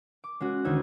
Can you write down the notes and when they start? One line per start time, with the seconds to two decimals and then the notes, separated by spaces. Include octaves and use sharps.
0.24 D6
0.40 G#3 C#4 F#4
0.64 D2 D#3 C#4 D#4 E6 G#6